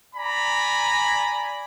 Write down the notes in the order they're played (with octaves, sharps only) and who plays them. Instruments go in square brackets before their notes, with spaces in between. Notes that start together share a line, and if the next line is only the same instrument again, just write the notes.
[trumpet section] D5 G#5 A#5 B5